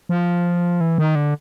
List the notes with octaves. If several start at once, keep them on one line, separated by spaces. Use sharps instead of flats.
F3
E3
D#3
D3